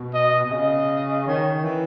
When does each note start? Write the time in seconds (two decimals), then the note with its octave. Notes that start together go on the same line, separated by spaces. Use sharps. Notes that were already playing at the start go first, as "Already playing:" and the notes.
Already playing: B2
0.14 D#5
0.45 B2
0.51 C#3 D#5
1.27 D#3 C#5
1.64 E3